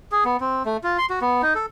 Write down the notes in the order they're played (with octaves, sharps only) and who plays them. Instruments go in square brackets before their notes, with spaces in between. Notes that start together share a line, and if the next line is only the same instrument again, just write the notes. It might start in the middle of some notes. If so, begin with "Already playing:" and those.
[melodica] G#4
B3
C4
A3
F4
C6
F#4
B3
D#4
A4